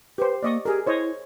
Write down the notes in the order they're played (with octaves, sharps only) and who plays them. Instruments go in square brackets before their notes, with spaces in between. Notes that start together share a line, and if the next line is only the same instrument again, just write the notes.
[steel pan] G4 C5 [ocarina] B4
[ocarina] A#3 [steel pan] D5 D#5 C#6
[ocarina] G4 [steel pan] G#4 A#4
[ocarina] E4 [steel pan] C5 C#5 D#5